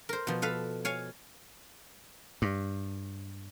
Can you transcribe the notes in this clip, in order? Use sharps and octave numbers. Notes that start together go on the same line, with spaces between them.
A#4 C5
B2 F3
A4 B4 F5
C#5 F5 G#5
G2